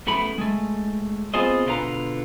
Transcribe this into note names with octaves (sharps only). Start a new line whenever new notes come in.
F#2 A3 B3 E4 B5
G#3 A3
B3 C4 F4 G#4 C5 D#5
B2 D3 D#4 F4 B4 A#5